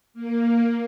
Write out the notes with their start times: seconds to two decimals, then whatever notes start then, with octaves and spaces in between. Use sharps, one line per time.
0.14 A#3